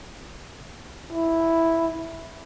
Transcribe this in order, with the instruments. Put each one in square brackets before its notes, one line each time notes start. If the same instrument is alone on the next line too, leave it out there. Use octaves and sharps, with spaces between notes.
[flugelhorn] E4